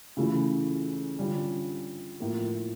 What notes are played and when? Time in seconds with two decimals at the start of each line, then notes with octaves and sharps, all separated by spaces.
0.17 C#3 E3 A3 C#4 E4
1.19 D3 G3 C#4 F4
2.20 A2 F3 A#3